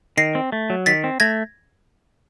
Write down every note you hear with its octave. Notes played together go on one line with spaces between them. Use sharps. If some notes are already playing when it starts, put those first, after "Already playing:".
D#3 A#6 C7
C4
A3
F#3
D#3 A6 B6
C4
A3 G#6 A#6